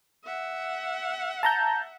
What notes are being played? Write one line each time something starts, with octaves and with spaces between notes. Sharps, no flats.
E5 F#5
A5 A#5 G6